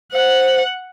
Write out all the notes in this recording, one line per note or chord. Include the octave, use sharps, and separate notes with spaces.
C5 F#5